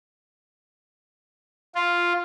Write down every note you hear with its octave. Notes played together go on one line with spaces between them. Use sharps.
F4